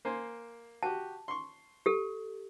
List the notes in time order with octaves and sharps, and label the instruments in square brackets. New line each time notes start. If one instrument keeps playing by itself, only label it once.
[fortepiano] A#3 C5 G#5
[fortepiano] F#4 G4 [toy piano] A5
[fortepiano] C6 C#6
[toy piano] G4 A4